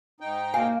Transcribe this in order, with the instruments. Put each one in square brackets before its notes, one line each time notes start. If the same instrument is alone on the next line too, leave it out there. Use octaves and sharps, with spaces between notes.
[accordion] G#2 D#4 G5
[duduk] A#3 [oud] F#4 F5 [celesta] G#5